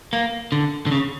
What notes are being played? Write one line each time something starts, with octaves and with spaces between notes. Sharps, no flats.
A#3
D3
D3
C#3